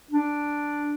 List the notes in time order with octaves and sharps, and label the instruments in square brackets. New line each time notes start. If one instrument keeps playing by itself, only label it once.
[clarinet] D4